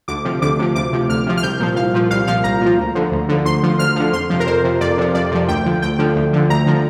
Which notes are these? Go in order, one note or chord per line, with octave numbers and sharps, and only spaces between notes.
D2 D6
C3 F3
D2 D6
C3 F3
D2 D6
C3 F3
D2 F6
C3 F3
F6
C2 G6
A#2 F3
C2 F5
A#2 F3
C2 F5
A#2 F3 F5
C2 A#5
A#2 F3
D2
D3 F3
D2
D3 F3
D2 C6
D3 F3
D2 F6
D3 F3
F2 C6
C3 F3
A#4
F2 C5
C3 F3
F2 D5
C3 F3
F2 D5
C3 F3
D2 G5
D3 F3
D2 G5
D3 F3
D2
D3 F3
D2 A#5
D3 F3